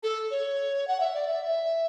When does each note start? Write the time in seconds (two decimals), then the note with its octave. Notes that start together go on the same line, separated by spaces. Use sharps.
0.03 A4
0.31 C#5
0.88 F#5
1.00 E5
1.14 D5
1.28 E5
1.44 E5